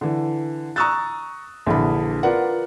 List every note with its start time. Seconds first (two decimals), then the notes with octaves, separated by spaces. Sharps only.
0.01 D3 E3
0.76 A#5 C#6 D#6 E6 F#6 A6
1.67 A#1 D3 E3 B5
2.23 F4 A#4 B4 D5 F#5